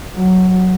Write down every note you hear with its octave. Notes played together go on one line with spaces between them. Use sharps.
F#3